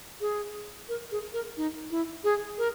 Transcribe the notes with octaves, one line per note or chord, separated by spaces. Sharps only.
G#4
A#4
G#4
A#4
D#4
E4
G#4
A#4